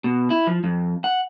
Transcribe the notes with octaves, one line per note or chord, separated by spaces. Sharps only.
B2
E4
F3
F2
F#5